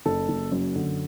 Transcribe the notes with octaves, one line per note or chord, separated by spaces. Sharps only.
F#1 A4
F#1
F#2
D3